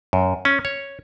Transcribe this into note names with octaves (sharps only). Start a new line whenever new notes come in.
F#2
C#4
C#5